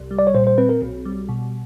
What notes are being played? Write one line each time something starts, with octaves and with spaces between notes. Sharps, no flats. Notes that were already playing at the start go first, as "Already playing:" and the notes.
Already playing: C2
G3
D5
C#5
A#2 C5
C5
C4 B4
A#4
B1
G3
B2